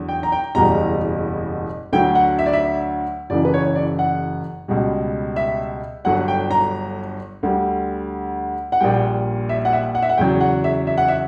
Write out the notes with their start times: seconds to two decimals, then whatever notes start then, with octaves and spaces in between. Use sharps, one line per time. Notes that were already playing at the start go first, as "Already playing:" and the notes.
Already playing: E2 D3 F#3
0.09 G5
0.23 A#5
0.32 G5
0.55 F#1 E2 B2 G3 A#5
1.93 D2 D3 F#3 G5
2.15 F#5
2.39 E5
2.46 D5
2.53 E5
3.30 F#1 F#2 C#3 E3 D5
3.45 B4
3.54 C#5
3.66 C#5
3.75 D5
3.99 F#5
4.68 C#2 B2 G3
5.36 E5
6.05 G1 G2 D3 F#3 F#5
6.28 G5
6.51 A#5
7.43 D2 D3 G3
8.72 F#5
8.80 A#1 A#2 G3 G5
9.49 E5
9.65 F#5
9.73 E5
9.95 F#5
10.02 E5
10.09 F#5
10.18 E2 C#3 F#3 G5
10.40 F#5
10.64 E5
10.87 E5
10.97 F#5
11.08 E5